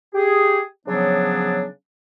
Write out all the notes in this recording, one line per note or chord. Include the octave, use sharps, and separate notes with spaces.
G4 G#4
C#3 F3 F#3 B3 D4